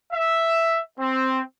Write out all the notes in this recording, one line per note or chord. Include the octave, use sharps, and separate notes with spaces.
E5
C4